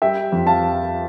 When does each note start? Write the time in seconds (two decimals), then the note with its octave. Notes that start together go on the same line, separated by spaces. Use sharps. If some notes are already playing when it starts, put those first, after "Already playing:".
0.02 G3 E5 G5
0.32 F2
0.47 F5 A5